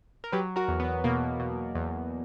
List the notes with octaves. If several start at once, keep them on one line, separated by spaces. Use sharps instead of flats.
A#4
F#3 G4 B4
F#4 A#4
E2
B3
B2 A#3
B2
E2